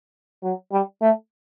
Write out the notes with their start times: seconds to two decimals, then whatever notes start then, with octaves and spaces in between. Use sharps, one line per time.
0.43 F#3
0.72 G3
1.01 A3